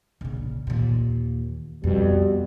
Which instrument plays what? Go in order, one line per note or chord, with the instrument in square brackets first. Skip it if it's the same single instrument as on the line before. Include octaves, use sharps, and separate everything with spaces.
[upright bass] A#1 C#3
D#2 A#2
[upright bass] F2 [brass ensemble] B2 G3